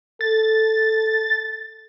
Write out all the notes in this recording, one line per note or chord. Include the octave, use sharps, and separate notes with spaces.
A4 A6